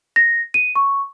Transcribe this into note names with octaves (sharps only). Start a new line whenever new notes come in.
A#6
D#7
C#6